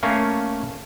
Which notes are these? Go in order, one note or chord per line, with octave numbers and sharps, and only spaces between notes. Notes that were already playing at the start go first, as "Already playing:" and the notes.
A3 A#3 C#4 F5